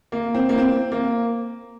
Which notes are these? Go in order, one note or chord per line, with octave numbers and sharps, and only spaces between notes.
A#3
C4
A#3
C4
A#3